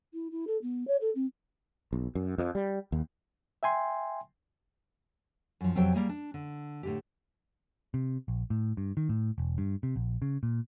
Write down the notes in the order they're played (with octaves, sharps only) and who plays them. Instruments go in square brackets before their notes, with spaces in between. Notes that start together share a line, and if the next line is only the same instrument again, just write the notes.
[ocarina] E4
E4
A4
B3
C#5
A4
C4
[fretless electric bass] B1
F#2
F2
G3
D#2
[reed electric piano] E5 G5 G#5 C6
[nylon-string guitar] F#2 F3
F2 C3 F#3 A4 C5 G5
G3 A#3 G#4
D4
D3
A2 D3 G4
[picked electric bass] C3
A#1
A2
G2
D#3
A2
E1
G2
C3
A#1
C#3
A#2